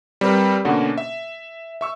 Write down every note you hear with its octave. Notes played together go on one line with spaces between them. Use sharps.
G3 C4 G4 A#4 B4
B2 D3 A#3 C#4 F#4
E5
E5 C#6 E6